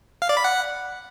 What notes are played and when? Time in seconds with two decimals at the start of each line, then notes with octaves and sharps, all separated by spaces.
0.22 F5
0.29 D5
0.37 B5
0.44 F#5